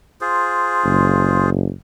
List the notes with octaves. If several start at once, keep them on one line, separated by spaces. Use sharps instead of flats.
F4 G#4 C5
F#1